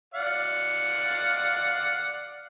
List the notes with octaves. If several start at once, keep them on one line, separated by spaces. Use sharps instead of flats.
D5 F5 F#5